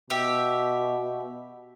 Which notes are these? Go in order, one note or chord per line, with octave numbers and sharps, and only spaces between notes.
B2 G4 E5